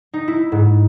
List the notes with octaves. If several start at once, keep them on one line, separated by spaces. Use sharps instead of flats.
D#4
E4
G#2